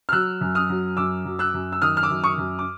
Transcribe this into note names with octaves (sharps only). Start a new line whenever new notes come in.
F6
F#3 E6 F#6
F#2
D#6 F6
F#3
F#2 D6 E6
F#3
E6 F#6
F#2
E6
D#3 D#6 F6
F6
D6 E6
F#2
C#6 D#6
F#2
D6